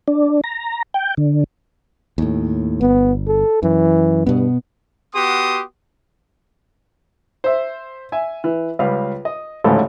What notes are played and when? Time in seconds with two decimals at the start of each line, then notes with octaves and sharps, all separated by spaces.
0.08 D4
0.44 A#5
0.94 G5
1.17 D3
2.18 D#2 A2
2.81 G1 B3
3.28 A4
3.63 F#2 E3
4.27 G2 B2 B3
5.15 B3 F#4 G4 C6 D#6
7.44 C5 E5
8.12 E5 G#5
8.44 E3
8.79 C#2 G3 B4 F5
9.25 D#5
9.64 A1 D2 G#2 C#3 A4 B5